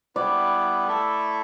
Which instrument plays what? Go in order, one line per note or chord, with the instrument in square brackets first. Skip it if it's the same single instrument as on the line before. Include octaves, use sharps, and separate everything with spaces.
[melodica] G3 B3 E4 B4 [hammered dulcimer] D5
[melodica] A3 E4 A4 E5